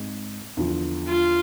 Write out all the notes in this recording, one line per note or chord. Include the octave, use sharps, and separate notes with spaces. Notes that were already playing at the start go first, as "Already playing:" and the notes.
Already playing: G#2 G#3 C4 G#4
E2 D3 F3
F4